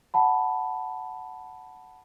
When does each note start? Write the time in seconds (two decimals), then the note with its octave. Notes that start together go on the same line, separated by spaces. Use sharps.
0.14 F#5 A5 B5